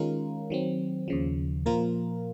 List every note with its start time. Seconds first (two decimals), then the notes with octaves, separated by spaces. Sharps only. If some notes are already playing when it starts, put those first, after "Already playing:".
Already playing: D#3 G#3 C#4 F4 A#4
0.50 D#3 F#3 C4
1.08 D#2 C#3 F3
1.66 A#2 F3 A#3 F4 A#4